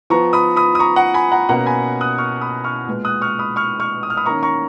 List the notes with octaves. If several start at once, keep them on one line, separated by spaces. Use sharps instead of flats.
F3 B3 A#5 C#6
B5 D#6
B5 D#6
D#6
A#5 C#6
F#5 A#5
G#5 B5
F#5 A#5
B2 A#3 C#4 F#5 A#5
G#5 B5
D#6 F#6
C#6 F6
B5 D#6
C#6 F6
A#2 G#3 B3
D#6 F#6
C#6 F6
B5 D#6
C#6 F6
C#6 F6
D#6
F6
B5 D#6
D#3 A#3 C#4 A#5 C#6
A#5 C#6